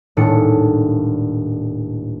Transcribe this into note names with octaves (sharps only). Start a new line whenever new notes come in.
D#1 A2 G#3 D4 C#7